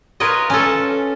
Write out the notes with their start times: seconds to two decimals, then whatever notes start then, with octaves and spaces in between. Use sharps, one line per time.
0.20 F4 A#4 B4 C#5 D#5
0.50 C#4 A4